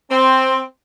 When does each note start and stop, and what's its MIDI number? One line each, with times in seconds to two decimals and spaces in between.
0.10 0.60 60